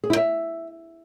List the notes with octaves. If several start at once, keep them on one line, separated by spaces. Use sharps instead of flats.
G#4
E4
E5